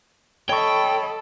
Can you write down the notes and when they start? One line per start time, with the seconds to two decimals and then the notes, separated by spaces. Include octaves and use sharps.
0.49 A4 C#5 D#5 G5 B5 C#6